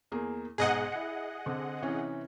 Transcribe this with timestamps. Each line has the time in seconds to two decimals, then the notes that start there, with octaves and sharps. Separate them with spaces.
0.12 E2 A#3 G#4
0.58 B1 G#2 G#4 D#5 F#5
0.92 E4 C#7
1.46 D3 C4 D4
1.82 C3 E3 C#4